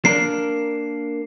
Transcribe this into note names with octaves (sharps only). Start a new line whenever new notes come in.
A#3 D4 A#4 C7